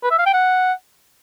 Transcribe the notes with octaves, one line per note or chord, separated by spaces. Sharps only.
B4
E5
F5
G5
F#5